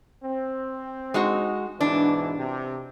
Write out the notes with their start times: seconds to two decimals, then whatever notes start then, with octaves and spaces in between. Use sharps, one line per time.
0.24 C4
1.14 G#3 D#4 F#4
1.81 G#2 B2 E3 D4
2.37 C3